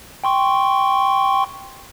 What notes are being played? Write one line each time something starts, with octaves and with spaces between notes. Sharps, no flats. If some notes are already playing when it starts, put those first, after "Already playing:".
G5 C6 C#6